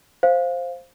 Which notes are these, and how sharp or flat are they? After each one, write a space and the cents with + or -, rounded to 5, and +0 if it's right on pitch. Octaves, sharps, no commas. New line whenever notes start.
C5 +5 F5 +0